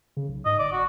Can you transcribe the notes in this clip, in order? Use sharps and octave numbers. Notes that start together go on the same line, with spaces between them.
C#3
B1
G#2 D#5
G1 D5
F#1 F#4